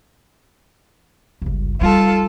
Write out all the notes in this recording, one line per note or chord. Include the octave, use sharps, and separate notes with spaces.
G1 C#2
G3 D#4 F4 A4